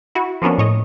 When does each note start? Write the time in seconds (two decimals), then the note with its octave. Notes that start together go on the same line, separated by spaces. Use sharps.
0.15 E4 F#4
0.42 F3 A#3 B3 C#4 D4
0.58 A2 C#5 D#5